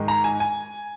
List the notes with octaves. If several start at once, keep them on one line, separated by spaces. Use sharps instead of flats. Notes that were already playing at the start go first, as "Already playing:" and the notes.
Already playing: G#2 D#3 G#3
A#5
G#5
G#5